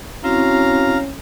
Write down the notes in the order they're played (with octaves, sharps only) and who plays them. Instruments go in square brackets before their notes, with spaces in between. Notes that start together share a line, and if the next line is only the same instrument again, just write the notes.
[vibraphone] C4 E4 [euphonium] C#4 [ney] F#4 [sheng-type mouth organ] F5 A#5